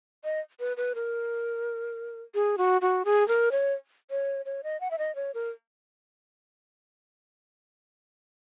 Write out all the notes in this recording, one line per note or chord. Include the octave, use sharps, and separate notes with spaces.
D#5
B4
B4
A#4
G#4
F#4
F#4
G#4
A#4
C#5
C#5
C#5
D#5
F#5
E5
D#5
C#5
A#4